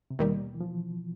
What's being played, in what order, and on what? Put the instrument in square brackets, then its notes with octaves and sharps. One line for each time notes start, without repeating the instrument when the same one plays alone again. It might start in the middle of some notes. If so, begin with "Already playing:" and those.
[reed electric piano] C3
[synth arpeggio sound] D#2 D#3 G3 [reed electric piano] B2
[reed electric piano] E3
F3